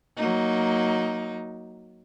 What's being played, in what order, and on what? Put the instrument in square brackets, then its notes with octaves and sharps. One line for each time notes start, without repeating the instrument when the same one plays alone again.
[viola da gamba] F#3 A#3 D#4